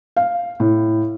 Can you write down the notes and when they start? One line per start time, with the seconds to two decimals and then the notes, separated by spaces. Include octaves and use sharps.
0.16 F5
0.60 A2